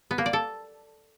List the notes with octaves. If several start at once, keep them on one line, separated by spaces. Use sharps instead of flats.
B3
A#3
D5
A4